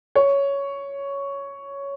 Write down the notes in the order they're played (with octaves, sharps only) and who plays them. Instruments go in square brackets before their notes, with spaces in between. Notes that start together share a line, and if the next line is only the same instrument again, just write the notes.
[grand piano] C#5